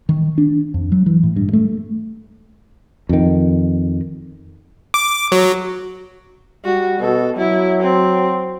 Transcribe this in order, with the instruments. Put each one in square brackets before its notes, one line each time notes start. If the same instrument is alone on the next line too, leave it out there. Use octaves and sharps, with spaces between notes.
[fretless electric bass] D#3
D4
F2
F#3
E3
A2
G2
A3
F2 D#3
[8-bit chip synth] D6
F#3
[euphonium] G3 [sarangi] F#4
[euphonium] B2 [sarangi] A4
[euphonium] F#3 [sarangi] E4
[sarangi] C4